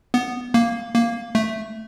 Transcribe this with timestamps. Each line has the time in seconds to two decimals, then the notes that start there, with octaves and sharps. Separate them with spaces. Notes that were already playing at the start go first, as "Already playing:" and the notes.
0.14 B3
0.54 A#3
0.95 A#3
1.35 A3